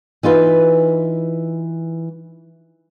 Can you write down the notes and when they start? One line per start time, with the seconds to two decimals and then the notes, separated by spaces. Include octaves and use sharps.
0.23 E3 D#4 F4 B4